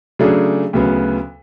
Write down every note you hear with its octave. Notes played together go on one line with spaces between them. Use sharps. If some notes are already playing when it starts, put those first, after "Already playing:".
C#3 F#3 A3 D4 G#4
D2 C#3 F#3 B3